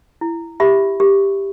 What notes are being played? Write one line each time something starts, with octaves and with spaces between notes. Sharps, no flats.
E4
G4 E5 B5
G4